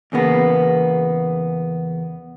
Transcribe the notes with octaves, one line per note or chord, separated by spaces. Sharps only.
E2 C#3 A#3 B3